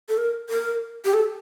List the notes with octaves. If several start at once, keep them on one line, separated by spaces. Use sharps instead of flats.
A4
A#4
A#4
G4
A4